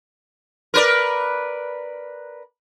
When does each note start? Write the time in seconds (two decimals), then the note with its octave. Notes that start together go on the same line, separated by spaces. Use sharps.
0.74 A#4 B4 D5